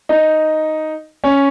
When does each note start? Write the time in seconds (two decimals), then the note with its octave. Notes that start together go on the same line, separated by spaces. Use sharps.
0.09 D#4
1.24 C#4